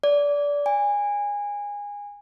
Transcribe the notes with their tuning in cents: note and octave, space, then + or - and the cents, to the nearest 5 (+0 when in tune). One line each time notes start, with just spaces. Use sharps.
D5 -20
G#5 -20